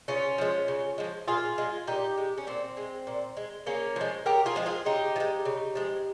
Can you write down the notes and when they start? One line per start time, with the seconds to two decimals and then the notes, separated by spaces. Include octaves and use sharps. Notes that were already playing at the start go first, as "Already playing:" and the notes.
0.08 C#3 C#4 F4
0.38 F3 G#3
0.68 C#3
0.98 F3 G#3
1.28 A#2 F4 G#4
1.58 G#3
1.87 A#2 D#4 G4
2.17 G#3
2.38 C#4
2.47 A#2 C4
2.77 G#3
3.07 A#2
3.37 G#3
3.66 C#3 A#3 C#4
3.96 F3 G#3
4.26 C#3 G4 A#4
4.46 F4 G#4
4.56 F3 G#3
4.66 F4 G#4
4.86 C#3 D#4 G4
5.16 F3
5.20 G#3
5.45 C#3
5.75 F3 G#3